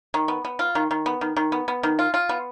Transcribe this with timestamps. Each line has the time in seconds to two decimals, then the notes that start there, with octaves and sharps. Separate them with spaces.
0.14 D#3
0.28 B3
0.45 B3
0.59 F4
0.75 D#3
0.91 D#3
1.06 B3
1.21 D#3
1.36 D#3
1.52 B3
1.68 B3
1.83 D#3
1.99 F4
2.14 F4
2.29 B3